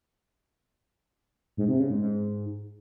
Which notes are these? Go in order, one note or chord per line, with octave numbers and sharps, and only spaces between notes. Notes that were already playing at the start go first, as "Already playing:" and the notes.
G#2
C3
C#3
G#2
G#2